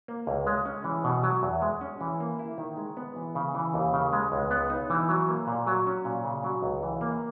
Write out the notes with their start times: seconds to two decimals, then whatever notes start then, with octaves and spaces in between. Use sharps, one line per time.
0.08 A#3
0.27 C#2
0.47 G#3
0.65 C#4
0.84 E3
1.04 B2
1.23 F#3
1.43 E2
1.62 G#3
1.81 C#4
2.01 E3
2.20 A#3
2.39 E4
2.58 D#3
2.77 G#3
2.97 B3
3.16 E3
3.35 C#3
3.55 E3
3.74 D#2
3.93 C#3
4.13 G#3
4.32 C#2
4.51 B3
4.70 D#4
4.90 E3
5.09 F#3
5.29 A#3
5.47 A#2
5.67 F#3
5.87 C#4
6.05 A#2
6.25 C#3
6.44 F#3
6.62 C#2
6.83 E3
7.01 A#3